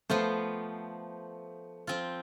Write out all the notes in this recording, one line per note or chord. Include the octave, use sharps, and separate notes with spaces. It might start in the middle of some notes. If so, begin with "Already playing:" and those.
F3 A3 B3 F4 C5
F3 C4 F4